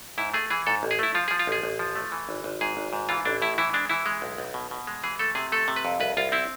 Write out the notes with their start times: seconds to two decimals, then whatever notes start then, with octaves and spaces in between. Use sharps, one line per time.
0.18 G#2 E4
0.34 A3 G#4
0.50 E3 G#4
0.67 G#2 A4
0.83 A1
0.91 G#4
0.99 A3 E4
1.15 F3 F4
1.28 F3 G#4
1.39 F4
1.47 A1 G#4
1.63 A1
1.79 F3
1.95 A3
2.12 E3
2.29 G#1
2.44 G#1
2.61 G#2 G#4
2.77 G#1
2.93 G#2
3.09 E3 F4
3.25 A1 D4
3.42 A2 E4
3.58 E3 E4
3.73 G#3 D4
3.89 E3 E4
4.06 G#3
4.22 B1
4.38 B1
4.54 B2
4.71 B2
4.87 G#3
5.03 E3 G#4
5.19 A3 A4
5.35 C3 G#4
5.52 A3 A4
5.68 C3
5.76 B4
5.85 F2
6.00 C2 B4
6.17 C2 F4
6.32 C4 E4